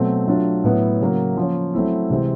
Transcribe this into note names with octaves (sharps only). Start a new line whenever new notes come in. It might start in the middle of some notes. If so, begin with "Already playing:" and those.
Already playing: B2 F#3 A3 C4
F#3 A3 D4 F4
A2 F#3 B3 E4
C#3 F#3 A#3
F3 A#3 C#4
F#3 A3 C4 E4
C3 E3 G#3 C4